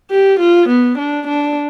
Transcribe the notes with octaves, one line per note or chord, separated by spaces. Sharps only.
G4
F4
B3
D4
D4